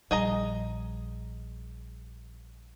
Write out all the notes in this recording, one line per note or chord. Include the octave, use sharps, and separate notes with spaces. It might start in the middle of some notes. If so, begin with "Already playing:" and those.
A#1 G3 G#4 D#5 A#5